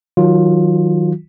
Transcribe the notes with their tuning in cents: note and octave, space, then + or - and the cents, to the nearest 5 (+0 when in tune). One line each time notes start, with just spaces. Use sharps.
D#3 +25 F#3 +0 F4 +15